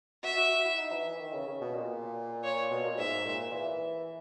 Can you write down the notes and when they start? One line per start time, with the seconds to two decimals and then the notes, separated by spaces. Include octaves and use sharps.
0.24 F#4 E5
0.37 F#4
0.51 F#4
0.65 E4
0.79 D#4
0.92 E3
1.06 E3
1.20 D#3
1.33 C#3
1.47 C#3
1.61 B2
1.75 A#2
2.44 C#5
2.71 B2
2.85 A#2
2.98 G#2 E5
3.26 A#2
3.53 E3